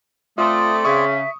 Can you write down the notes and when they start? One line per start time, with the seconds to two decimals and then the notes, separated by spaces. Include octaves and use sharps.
0.38 A3 C4 F4 D5 D#6
0.85 C#3 E5 C#6 D#6